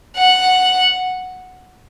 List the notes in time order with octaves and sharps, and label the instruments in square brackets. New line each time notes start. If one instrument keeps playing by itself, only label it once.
[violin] F#5